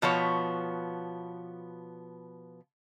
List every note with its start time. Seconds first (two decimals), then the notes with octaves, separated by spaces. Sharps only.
0.02 B2 F3 B3 C#5